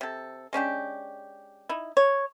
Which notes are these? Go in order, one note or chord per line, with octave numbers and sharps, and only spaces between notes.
C3 A4
G#3 C#4 D4 G4
D#4 E4
C#5